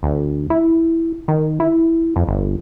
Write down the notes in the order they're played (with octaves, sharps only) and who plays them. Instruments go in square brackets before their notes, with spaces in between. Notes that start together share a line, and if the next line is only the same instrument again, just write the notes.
[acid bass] D2
E4
D#3
E4
F2
G1